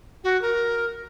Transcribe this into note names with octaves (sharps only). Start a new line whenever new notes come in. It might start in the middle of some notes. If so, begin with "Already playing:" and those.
F#4
A#4